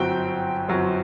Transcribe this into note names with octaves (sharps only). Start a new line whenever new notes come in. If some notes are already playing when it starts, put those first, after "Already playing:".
Already playing: G1 F#2 F#3 C4 G5
G1 F#2 F#3 C4